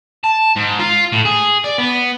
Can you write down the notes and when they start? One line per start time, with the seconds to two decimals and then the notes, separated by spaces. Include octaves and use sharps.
0.24 A5
0.56 G#2
0.79 F4
1.13 A2
1.25 G#4
1.64 D5
1.78 B3